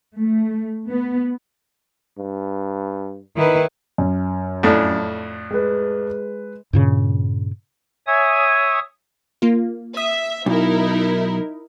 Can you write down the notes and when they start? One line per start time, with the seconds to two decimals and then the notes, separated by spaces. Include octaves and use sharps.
0.17 A3
0.90 B3
2.18 G2
3.37 D#3 D#4 E4 B4
3.98 F#2
4.63 F2 A2 D4
5.51 G#3 B4
6.73 G2 A#2 C#3
8.07 C#5 E5 G#5 D#6
9.42 A#3 F4
9.97 E5 D#6
10.46 B1 D#4 E4 A#4